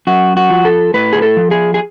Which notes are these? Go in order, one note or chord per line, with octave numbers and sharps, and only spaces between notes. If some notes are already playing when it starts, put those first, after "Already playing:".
F#2 F#4
F#4
F3
A4
A2 B4
G#4
A4
F3
G#4
G#4